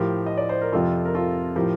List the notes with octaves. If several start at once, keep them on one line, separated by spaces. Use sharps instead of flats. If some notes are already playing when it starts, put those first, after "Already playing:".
Already playing: A2 F3 G4 A#4
D#5
D5
C5
A#4
F2 C3 F3 F4 A4
A#4
F4 A4
A2 F3 G4 A#4